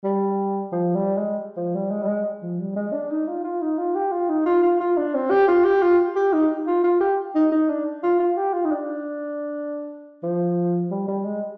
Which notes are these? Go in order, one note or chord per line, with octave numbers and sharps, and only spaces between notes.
G3
F3
G3
G#3
F3
G3
G#3
G3
G#3
F3
G3
G#3
D4
D#4
F4
F4
D#4
F4
G4
F4
D#4
F4
F4
F4
D4
C4
G4
F4
G4
F4
G4
D#4
F4
F4
G4
D#4
D#4
D4
F4
F4
G4
F4
D#4
D4
F3
G3
G3
G#3